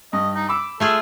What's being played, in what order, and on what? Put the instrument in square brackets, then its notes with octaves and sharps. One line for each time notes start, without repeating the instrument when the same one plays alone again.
[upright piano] G2 [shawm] D#5
[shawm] D#4
[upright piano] B5 E6 [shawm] D6
[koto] A3 F4 G#4 [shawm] A4